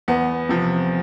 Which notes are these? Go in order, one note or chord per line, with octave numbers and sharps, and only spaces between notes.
E2 B3
C3 F3